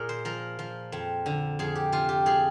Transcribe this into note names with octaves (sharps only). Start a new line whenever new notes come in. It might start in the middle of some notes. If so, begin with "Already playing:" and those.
Already playing: A#2 G#4 A#4
C5
F3 A#4
F3
F2
D3
F2 G#4
G4
C3 F4
G4
F3 G#4